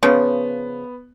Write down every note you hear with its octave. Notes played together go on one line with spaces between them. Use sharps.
C#3 F3 B3